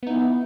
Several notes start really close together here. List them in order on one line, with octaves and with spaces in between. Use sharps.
B3 D#4 E4